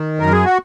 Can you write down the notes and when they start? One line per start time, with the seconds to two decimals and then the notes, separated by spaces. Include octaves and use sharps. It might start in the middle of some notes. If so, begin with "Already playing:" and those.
Already playing: D#3
0.20 F#2 A#4
0.32 G#4
0.45 F#4